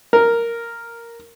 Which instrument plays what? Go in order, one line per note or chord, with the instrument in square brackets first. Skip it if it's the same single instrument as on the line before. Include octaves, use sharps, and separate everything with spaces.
[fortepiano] A#4